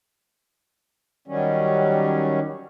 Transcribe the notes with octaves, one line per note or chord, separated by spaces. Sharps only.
D#3 F#3 G3 C#4